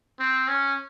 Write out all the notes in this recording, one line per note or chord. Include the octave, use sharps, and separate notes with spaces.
C4
C#4